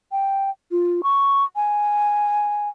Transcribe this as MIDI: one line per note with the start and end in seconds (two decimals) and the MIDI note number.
0.12 0.50 79
0.71 1.01 65
1.03 1.44 85
1.56 2.69 80